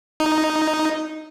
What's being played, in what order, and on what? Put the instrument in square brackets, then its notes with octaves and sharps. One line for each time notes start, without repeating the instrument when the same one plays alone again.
[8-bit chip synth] D#4